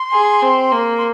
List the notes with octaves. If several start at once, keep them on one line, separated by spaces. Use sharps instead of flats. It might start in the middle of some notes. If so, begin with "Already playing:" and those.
Already playing: C6
G#4
C4
A#3
C6